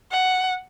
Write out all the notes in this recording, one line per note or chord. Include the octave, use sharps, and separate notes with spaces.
F#5